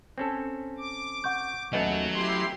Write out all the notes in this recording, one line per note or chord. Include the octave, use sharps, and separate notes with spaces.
C4 C#4 A4
D6
F#5 C#6 G6
D#2 F#3 A3 B3 C#4 D#5
E4 G4 C6